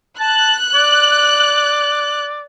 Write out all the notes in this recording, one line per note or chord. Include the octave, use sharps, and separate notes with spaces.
A5 F#6
D5